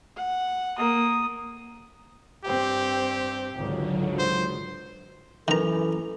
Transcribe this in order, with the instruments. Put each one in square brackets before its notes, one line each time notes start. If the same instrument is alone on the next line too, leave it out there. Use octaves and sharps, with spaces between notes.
[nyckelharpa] F#5
A#3 D#6
[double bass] G2 C4 [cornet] G4
[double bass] G#1 C#2 [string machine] D3 F#3
[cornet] C5
[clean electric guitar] F#2 [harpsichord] D#3 A#5 [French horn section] E3 [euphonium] A4